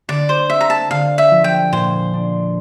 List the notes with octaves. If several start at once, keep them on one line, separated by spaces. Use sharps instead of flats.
D3 D5
C5
C4 E5
A#5
A5
D3 F5
E5
F3
G5
A#2 C5
D4